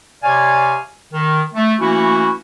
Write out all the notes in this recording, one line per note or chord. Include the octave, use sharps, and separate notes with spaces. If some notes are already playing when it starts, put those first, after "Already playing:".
C3 C#5 D5 F5 G#5
D#3
A3
E3 A3 A#3 C#4 E4 F#4